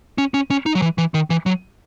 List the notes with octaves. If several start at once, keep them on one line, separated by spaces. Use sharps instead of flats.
C#4
C#4
C#4
D#4
F#3
E3
E3
D#3
E3
F#3